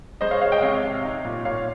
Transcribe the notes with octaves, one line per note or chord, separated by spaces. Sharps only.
G#3 C5 D#5
C#5 F5
G#3 C#5 F5
D#5 G5
C3 C#5 F5
C3
D#4
A#2
A#2 C#5 F5